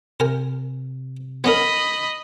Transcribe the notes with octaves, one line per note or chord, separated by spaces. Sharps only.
C3 A#4 G#5
B3 C#4 A#4 D#5 B5